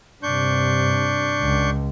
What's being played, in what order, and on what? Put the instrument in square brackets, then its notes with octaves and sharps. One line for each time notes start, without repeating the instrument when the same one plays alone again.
[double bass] G2 C3 [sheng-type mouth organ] D4 C#6 G6
[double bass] C#2